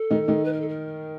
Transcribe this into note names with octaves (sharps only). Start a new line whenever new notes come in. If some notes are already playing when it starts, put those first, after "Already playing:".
Already playing: A4
D#3 D#4
D#3 D#4
B4
A#4
A4
A#4